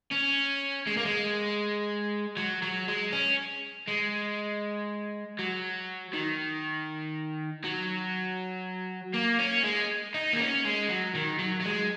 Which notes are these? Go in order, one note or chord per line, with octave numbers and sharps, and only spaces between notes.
C#4
G#3
A#3
G#3
F#3
F#3
G#3
C#4
G#3
F#3
D#3
F#3
A#3
C#4
G#3
D#4
A#3
C#4
G#3
F#3
D#3
F#3
F#3
G#3